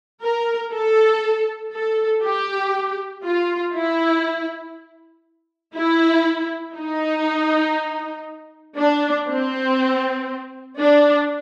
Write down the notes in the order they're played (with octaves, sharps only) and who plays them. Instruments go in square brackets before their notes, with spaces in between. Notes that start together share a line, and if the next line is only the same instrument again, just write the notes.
[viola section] A#4
A4
A4
G4
F4
E4
E4
D#4
D4
C4
D4